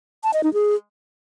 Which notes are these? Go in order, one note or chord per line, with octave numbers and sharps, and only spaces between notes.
A5
D#5
D#4
G#4